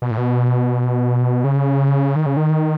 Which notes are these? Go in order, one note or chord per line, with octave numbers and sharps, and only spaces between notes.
B2
A2
B2
C#3
D#3
C#3
D#3